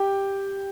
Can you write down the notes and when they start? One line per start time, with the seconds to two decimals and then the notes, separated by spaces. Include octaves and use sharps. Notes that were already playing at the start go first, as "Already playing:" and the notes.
Already playing: G4 G5